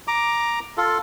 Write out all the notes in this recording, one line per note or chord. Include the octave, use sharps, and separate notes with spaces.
A#5 D6
F4 A4